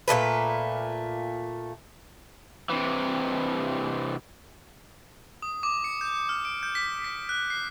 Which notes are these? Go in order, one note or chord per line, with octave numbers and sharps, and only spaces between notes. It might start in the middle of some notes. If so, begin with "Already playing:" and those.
A#2 F3 A3 B4
C3 E3
D#6
D6
C#7
G6
F6
D7
G6
B6
B6
F#6
C7